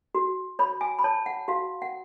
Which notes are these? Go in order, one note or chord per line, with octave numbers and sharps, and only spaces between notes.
F#4
C#5 B5
G#5
B5
C#5 A5
F#5
F#4 F5
F#5